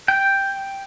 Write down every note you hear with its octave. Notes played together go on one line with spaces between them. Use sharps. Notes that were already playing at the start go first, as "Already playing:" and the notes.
G5